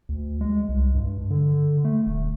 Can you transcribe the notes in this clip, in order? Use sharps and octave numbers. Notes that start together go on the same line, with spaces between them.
D2
G#3
C2
G2
D3
A3
D#1